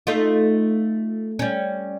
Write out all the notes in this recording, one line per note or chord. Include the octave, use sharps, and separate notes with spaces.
A3 D#4 F4
G3 C#4